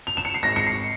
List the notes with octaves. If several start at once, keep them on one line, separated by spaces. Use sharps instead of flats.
F7
E7
C#7
C7
G#1 A#6
C#7
C7